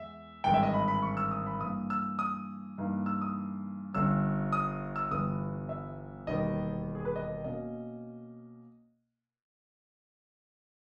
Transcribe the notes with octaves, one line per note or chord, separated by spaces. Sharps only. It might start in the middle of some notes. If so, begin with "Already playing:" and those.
Already playing: E2 G#3 E5
G#1 G2 E3 G#3 G5
E5
D#5
B5
B5
C#6
E6
D#6
B5
G2 E3 A#3 D#6
E6
D#6
G2 E3 A#3 D#4
E6
D#6
G1 G2 G3 C#4 E6
D#6
E6
G1 G2 E3 G3 B3 D#6
E5
E1 D#2 D#3 G3 B3 D#5
G#4
B4
D#5
B2 A#3 C#4 D#5